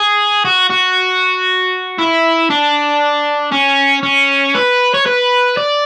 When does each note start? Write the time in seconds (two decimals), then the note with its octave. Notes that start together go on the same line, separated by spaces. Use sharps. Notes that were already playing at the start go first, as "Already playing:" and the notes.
Already playing: G#4
0.45 F#4
0.70 F#4
1.98 E4
2.50 D4
3.52 C#4
4.03 C#4
4.55 B4
4.94 C#5
5.06 B4
5.57 D5